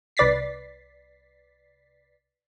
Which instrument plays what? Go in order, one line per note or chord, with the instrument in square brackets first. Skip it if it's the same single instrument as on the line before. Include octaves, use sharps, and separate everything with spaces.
[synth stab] C2 B4 D5 A6 B6 C7